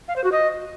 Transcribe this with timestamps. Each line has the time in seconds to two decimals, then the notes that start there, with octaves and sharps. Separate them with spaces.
0.08 F5
0.16 C5
0.24 F#4
0.32 D#5